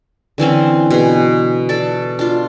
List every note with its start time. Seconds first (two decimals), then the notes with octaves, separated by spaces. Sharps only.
0.38 D3 E3 C4 C#4
0.91 B2 G#4
1.69 A4 D5
2.19 D4 F4